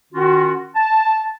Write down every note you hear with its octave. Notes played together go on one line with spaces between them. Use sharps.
D#3 C#4 F4 F#4
A5